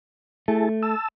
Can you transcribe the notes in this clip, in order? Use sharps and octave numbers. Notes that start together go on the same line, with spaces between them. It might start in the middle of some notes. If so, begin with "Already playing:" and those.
A3 E4 G#4 A5
A5 E6